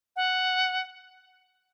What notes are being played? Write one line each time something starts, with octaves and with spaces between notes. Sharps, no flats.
F#5